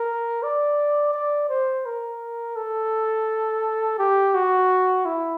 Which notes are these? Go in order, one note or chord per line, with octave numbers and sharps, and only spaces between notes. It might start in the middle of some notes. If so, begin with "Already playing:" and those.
Already playing: A#4
D5
D5
C5
A#4
A4
G4
F#4
E4